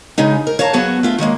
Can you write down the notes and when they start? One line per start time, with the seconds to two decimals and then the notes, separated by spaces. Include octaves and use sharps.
0.18 C#3 G#3 D#4
0.47 A#4
0.59 C#5 F5 A5 A#5
0.73 F#3 B3 F#4 G#4 C#5
1.03 A3 F4 E5
1.18 D#3 F#3 G#3 A#3